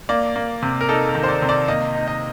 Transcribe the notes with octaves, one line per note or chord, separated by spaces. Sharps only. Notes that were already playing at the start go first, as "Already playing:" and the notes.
A#3 D5
A#3
C3
A#4
D#4 A4
A#4
D#3
C5
D5
C3
D5
A#3 D#5
D#4
D#5